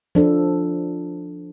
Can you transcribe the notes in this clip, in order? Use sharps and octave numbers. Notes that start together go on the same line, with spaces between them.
F3 D4 A4